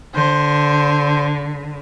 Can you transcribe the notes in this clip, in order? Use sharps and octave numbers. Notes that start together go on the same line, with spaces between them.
D3 C5